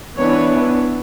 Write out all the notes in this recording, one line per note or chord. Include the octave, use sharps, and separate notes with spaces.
E3 B3 D4 C#5